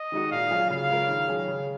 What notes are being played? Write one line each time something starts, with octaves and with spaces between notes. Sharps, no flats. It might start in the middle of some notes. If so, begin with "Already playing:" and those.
Already playing: D#5
D#3 G#3 D#4 F#4
A#2 F5
F#3 C#4 F4 G#4
C#3 F5
G#3 C#4 F4 A#4
D#3
F#3 C#4 G#4
C#3